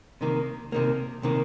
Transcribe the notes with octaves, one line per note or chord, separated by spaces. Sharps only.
C3 D#3 A#3
C3 D#3 A#3
C3 D#3 A#3